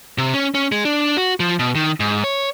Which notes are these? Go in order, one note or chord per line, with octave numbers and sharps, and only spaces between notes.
C3
C#4
C#4
G#3
D4
F#4
F3
B2
D#3
G#2
C#5